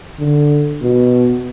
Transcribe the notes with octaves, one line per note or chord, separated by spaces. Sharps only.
D3
B2